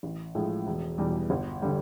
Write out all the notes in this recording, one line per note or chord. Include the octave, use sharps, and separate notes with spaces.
A1
A2 F3 G#3
E1
E2 B2 G3
G1
D3 G3